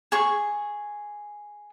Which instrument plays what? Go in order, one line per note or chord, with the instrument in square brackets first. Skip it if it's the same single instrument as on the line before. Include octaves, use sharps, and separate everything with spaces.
[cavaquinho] G#4 C#6